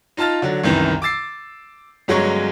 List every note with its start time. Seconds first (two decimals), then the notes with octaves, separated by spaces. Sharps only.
0.17 D#4 F4 A5 F6 A6
0.42 D3 F#3
0.64 C2 F#2 D#3 E3
1.02 D6 E6 A6 C7
2.08 G1 F#3 G#3 C#4 A#5 C#6